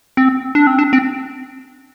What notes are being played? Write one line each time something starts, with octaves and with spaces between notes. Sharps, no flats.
C4
D4
C4
D4
C4